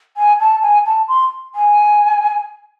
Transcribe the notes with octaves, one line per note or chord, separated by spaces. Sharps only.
G#5
A5
G#5
A5
C6
G#5